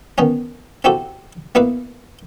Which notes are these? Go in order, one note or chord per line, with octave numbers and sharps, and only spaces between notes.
D#3 B3 C#4
C4 E4 F#4 G4 A4
A#3 B3 E4 B4 F5